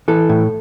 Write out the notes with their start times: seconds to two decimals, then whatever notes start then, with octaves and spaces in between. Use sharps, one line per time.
0.08 E3 A4
0.29 A2